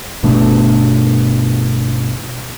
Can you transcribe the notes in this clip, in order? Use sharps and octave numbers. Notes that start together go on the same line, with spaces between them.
G1 B2 A3 D4